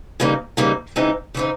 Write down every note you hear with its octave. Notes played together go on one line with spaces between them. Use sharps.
C#3 E3 G3 A#3 D#4
C#3 E3 G3 A#3 D#4
C#3 E3 G#3 C4 D#4
C#3 E3 G#3 C4 D#4